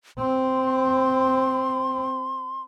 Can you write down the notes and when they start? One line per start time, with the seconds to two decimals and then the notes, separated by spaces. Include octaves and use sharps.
0.19 C4 C6